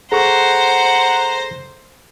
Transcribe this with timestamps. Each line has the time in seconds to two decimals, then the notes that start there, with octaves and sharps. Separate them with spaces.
0.12 G#4 A4 C5 F#5 A#5 C#6